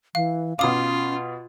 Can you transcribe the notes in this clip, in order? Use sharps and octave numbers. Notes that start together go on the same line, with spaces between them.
E3 F5
B2 C#4 F4 F5 D6 D#6